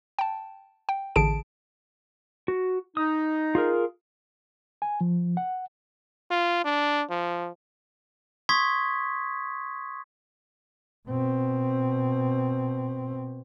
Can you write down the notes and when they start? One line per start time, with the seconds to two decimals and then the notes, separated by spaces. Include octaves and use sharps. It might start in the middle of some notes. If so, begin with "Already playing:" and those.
0.19 G5 A5
0.89 G5
1.16 A1 D3 G#4 A5 D7
2.48 F#4
2.97 D#4 D#6
3.55 F4 G#4 A#4
4.82 G#5
5.01 F3
5.37 F#5
6.30 F4
6.64 D4
7.10 F3
8.49 C6 C#6 D#6 G#6 B6
11.07 B2 C4